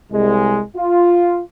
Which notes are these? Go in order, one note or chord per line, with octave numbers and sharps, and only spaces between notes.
C2 G#3
F4